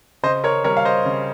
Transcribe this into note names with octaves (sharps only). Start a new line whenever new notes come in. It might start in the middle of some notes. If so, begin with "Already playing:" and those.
C#3 C5 D#5
A#4 C#5
G3 A#4 C#5
F5
C5 D#5
C#3